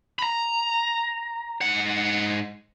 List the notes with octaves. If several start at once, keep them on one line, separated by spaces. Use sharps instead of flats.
A#5 B5
G#2 F#5